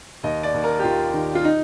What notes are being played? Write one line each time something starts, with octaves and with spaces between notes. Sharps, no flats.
D#2 D#5
D5
D#2
A#4
G4
D#2 F4
D#3
F4
D#4